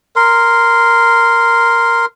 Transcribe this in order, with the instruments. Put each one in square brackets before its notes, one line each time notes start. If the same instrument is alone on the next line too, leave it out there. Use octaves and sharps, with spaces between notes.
[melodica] A#4 C6